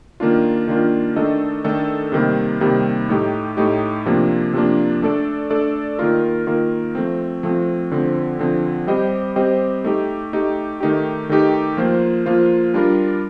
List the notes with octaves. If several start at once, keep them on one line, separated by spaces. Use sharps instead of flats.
D#3 A#3 D4 F4
D#3 A#3 D4 F4
D#3 A3 D4 A4 D#5
D#3 A3 D4 A4 D#5
C3 D#3 G3 A#3
C3 D#3 G3 A#3
A2 A3 D#4 G4
A2 A3 D#4 G4
C3 F3 A#3 D4
C3 F3 A#3 D4
A3 D4 A4 D5
A3 D4 A4 D5
D#3 A#3 F4 A#4
D#3 A#3 F4 A#4
F3 A3 C4
F3 A3 C4
D3 F3 C4
D3 F3 C4
G3 C4 G4 C5 D#5
G3 C4 G4 C5 D#5
A3 D#4 G4
A3 D#4 G4
D#3 A3 D#4 G4
D#3 A3 D#4 G4
F3 A#3 F4 C5
F3 A#3 F4 C5
G3 D4 F4 A#4